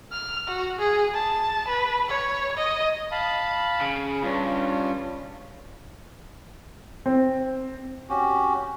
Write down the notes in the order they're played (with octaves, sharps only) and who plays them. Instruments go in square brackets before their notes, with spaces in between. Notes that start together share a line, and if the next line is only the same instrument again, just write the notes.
[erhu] F6
F#4
G#4
A5
B4
C#5
D#5
[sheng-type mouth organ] F5 A5 B5
[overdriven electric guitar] C#3
[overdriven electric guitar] G2 [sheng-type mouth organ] C#4 F4
[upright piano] C4
[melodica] C#4 F#4 G4